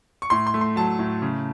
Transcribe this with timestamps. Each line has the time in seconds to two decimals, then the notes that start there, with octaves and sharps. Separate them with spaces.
0.22 C#6
0.30 A2 C6
0.47 C6
0.54 A3
0.61 C6
0.76 F#3 A5
0.99 A2
1.22 C#3